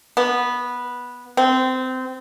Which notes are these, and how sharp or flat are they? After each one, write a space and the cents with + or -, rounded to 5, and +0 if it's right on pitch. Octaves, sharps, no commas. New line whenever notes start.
B3 -10
C4 -20